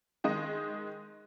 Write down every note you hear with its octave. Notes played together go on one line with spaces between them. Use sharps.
D#3 G#3 D#5